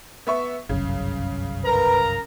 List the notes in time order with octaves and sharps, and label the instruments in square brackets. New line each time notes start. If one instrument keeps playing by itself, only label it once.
[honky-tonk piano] B3 E5 C#6
[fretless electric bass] G1 C2 F#2 [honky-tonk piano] C#3
[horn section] A#4 A#5 [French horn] B4